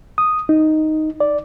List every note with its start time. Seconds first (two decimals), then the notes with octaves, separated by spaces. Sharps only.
0.18 D#6
0.49 D#4
1.20 D5